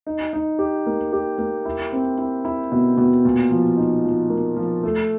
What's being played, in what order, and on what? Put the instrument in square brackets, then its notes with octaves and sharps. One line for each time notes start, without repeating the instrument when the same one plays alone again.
[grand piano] D#4
D#4
G4
A#3
G4
A#3
E4
C4
E4
E4
B2
B2
A#2
F3
D#4
F3
A#3
F3
A3